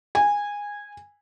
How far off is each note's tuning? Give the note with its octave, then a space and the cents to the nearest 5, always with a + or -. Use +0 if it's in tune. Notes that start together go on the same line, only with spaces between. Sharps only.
G#5 -15